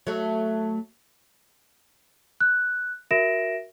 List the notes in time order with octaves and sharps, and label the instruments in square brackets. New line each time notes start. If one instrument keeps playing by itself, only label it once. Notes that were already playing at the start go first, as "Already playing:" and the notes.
[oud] F#3 A3
[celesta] F#6
F#4 A#4 E5 A#6 D7 E7